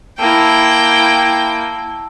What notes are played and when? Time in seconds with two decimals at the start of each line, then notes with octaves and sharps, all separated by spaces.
0.19 A#3 E4 G5 A5 E6